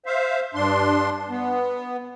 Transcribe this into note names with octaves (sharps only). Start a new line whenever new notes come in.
C5 E5 F5
G2 D4 C6
B3